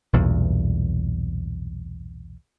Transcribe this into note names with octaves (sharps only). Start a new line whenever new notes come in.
B1 E2 G2 A#2